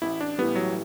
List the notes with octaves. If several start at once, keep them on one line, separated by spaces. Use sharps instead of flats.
A1 E4
D4
A2 E3 G3 B3
F#3